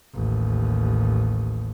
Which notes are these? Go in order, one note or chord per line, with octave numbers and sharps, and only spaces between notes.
A1 D#2